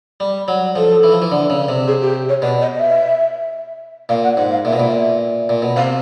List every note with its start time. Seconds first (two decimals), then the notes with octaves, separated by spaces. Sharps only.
0.20 G3
0.48 F#3
0.76 F3 A4
1.03 E3
1.12 F3
1.22 E3
1.32 D3
1.50 C#3
1.69 C3
1.87 G#4
2.01 G4
2.29 C#5
2.42 B2 D5
2.61 D#5
2.74 D#5
2.79 E5
4.09 A#2 F5
4.23 F#5
4.37 G#2 F#5
4.51 F5
4.65 A#2 E5
4.73 B2
4.80 A#2
5.49 A#2
5.62 B2
5.76 C3 F5